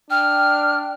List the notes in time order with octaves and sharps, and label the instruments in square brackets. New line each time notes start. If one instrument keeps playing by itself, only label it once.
[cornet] D4 [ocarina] G5 [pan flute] F6